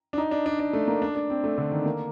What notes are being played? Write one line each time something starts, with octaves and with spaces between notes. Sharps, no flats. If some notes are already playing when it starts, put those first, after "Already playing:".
D4
D#4
D4
D4
D4
A3
A#3
D4
D4
C4
A3
D3
D#3
A#3